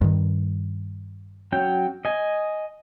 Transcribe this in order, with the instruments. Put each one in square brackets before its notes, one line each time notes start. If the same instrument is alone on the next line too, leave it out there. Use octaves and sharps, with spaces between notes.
[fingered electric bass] G2 D#3
[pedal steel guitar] F#3 C#4 G5
D#5 G#5